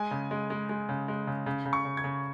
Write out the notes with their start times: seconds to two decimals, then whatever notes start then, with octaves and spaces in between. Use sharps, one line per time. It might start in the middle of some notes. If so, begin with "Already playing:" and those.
Already playing: G#3 G#5
0.11 C#3
0.31 G#3
0.50 G#3
0.69 G#3
0.89 C#3
1.08 G#3
1.27 C#3
1.46 C#3
1.66 C#3
1.73 C#6
1.85 C#3
1.97 G#6
2.04 C#3